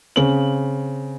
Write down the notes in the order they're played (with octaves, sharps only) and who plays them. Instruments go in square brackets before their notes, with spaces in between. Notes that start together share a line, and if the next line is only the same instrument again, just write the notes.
[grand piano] C#3 C4 F#7